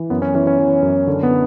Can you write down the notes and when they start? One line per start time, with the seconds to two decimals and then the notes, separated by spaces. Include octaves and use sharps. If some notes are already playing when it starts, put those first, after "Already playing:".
Already playing: E3
0.10 F#2 B3
0.22 C#4
0.35 E3 C#4
0.47 C#4
0.59 E3
0.82 F#2
1.07 D3
1.23 B3